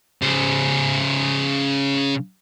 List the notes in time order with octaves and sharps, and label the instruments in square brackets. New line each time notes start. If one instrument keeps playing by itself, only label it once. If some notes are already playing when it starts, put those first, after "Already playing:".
[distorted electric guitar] C#3 C5